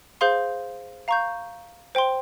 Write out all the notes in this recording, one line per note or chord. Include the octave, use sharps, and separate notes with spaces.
G#4 C5 F5 C6 G6
F5 A#5 C#6 G6
C5 G5 C6